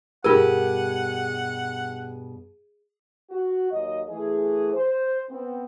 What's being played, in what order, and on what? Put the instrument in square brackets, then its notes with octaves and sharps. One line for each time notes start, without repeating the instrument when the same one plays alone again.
[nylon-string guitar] G2 B2 G4 [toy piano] F4 A#4 [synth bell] G#4 [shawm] F#5
[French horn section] F#4
D#2 F#3 D#5
E3 A3 G#4
C5
B3 C4